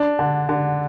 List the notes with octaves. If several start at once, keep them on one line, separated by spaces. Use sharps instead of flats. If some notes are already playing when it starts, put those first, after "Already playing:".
Already playing: D4
D3
D3